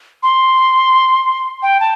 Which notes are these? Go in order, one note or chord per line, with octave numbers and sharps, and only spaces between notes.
C6
G5
A5